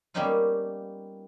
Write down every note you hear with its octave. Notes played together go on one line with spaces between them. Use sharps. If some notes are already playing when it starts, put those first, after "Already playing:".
G3 A#3 B3 C#4 D#4 F4